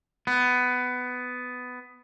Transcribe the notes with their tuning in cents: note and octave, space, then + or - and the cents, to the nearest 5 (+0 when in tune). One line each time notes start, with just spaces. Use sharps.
B3 +15